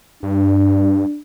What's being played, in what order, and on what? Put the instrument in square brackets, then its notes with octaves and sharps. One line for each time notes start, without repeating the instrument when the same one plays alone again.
[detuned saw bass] G2 [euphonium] D4